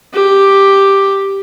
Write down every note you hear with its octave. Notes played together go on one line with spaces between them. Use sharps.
G4